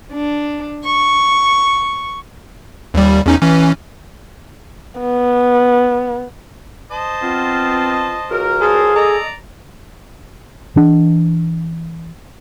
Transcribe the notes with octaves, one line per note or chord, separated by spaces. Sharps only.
D4
C#6
D#2 G3
E2 C#4 D#4
E3 C#4
B3
C5 D#5 A5
B3 C4 F4
C#2 F#4 A#4
G#4 A4 C5 F5
A4 D5 D#5 A#5
E3 D4